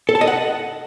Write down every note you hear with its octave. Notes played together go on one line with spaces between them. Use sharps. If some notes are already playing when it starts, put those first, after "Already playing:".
A4
A5
D#5
F#5